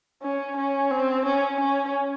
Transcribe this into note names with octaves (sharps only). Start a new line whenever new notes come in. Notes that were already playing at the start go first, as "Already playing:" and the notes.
C#4
C#4
C4
C#4
C#4